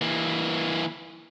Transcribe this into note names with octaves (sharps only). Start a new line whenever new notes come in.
E3 A#3